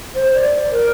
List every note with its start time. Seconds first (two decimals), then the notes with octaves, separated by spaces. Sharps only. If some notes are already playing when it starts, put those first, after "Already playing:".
0.15 C5
0.34 D5
0.71 A#4